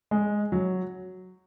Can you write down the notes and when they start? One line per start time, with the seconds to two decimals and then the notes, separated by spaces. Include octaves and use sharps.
0.11 G#3
0.52 F#3